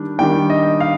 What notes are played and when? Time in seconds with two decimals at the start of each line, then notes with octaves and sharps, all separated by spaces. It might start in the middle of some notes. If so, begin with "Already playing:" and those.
Already playing: D#3 G3 D4
0.18 D#3 G3 D4 G5
0.50 D#5
0.80 F5